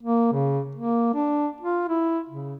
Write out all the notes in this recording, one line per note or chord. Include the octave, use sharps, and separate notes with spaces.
A#3
C#3
A#3
D4
F4
E4
C#3